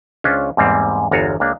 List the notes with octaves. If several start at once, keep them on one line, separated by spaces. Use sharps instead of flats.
C#2 C#4 D4 F4 C5 C#5
E2 G#2 G3 A#3 C4
G1 E2 F4 F#4 C#5 A#5
C#2 A#3 D4